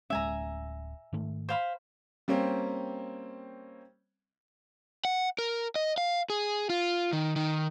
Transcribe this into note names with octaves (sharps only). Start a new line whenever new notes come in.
D1 G#3 C#4 E5 G#5 A#5
G#2 D#3 A3
C5 F5 B5
G3 A#3 C4 C#4
F#5
A#4
D#5
F5
G#4
F4
D#3
D#3